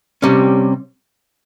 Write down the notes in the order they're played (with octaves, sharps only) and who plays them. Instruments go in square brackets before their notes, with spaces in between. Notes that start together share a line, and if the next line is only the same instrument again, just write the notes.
[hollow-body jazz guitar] C3 G3 C#4